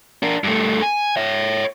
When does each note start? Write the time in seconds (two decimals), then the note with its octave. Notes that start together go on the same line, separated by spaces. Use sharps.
0.23 D4 A#4
0.44 G2 A3
0.83 G#5
1.17 C#5 E5